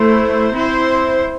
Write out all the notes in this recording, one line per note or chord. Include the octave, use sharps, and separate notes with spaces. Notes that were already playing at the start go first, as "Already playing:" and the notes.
Already playing: A3 E4 C5
C4 E4 C5